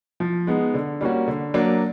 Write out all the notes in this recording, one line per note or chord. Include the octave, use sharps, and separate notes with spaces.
F3
G#3 B3 D#4
D3
G3 A#3 C#4 F#4
D3
F#3 A#3 D4